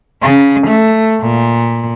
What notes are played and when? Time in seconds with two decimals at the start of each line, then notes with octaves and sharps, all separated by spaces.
0.23 C#3
0.68 A3
1.22 A#2